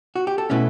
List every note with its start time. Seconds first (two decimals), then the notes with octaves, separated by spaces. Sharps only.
0.16 F#4
0.27 G4
0.38 A4
0.50 B2 A3 C#4 E4 B4